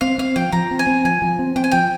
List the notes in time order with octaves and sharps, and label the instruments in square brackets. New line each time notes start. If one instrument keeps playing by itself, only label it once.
[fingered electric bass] C4 [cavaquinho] F5
[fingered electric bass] C4 [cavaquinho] F5
[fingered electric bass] F3 [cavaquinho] G5
[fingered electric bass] F3 [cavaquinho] A#5
[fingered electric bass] C4
[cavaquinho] G#5
[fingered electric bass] C4
[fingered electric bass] F3 [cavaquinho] G#5
[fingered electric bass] F3
C4
[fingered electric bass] C4 [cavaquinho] G5
[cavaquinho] G#5
[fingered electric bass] F3 [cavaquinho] G5